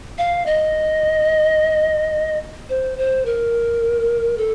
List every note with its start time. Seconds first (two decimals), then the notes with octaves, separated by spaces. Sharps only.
0.18 F5
0.46 D#5
2.69 C5
2.98 C5
3.25 A#4
4.38 A4